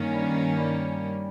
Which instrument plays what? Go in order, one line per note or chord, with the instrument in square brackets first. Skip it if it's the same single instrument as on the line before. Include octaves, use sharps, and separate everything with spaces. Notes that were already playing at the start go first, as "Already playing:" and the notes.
Already playing: [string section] G2 D#3 A#3 C#4
[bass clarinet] G3
G3